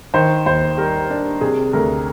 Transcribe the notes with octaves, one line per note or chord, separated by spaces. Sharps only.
D#3 C5
D#2 C5
G3 A#4
D4
C3 G#4
D2 A#4